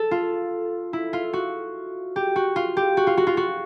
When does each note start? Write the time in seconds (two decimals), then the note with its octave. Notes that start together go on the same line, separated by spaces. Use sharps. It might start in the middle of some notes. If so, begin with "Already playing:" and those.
Already playing: A4
0.11 F4
0.93 E4
1.13 F4
1.33 F#4
2.16 G4
2.36 F#4
2.56 F4
2.77 G4
2.97 F#4
3.07 F4
3.17 F#4
3.27 F4
3.37 F#4